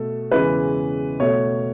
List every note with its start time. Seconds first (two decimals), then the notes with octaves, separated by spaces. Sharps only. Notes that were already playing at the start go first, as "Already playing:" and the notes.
Already playing: B2 A3 A4
0.31 E2 C#3 E3 G#3 B4
1.20 B2 A3 C#5